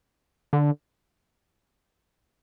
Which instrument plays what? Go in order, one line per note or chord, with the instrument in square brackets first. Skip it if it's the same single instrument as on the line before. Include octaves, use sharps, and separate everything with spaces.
[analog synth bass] D3